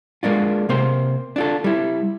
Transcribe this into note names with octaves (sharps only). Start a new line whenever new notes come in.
G#3 A#3 D4 F4
C3 A#3 C5
D4 F4 A4
G3 E4